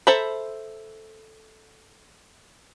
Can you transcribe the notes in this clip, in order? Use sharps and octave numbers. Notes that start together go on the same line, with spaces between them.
A4 C5 E5 A#5 B5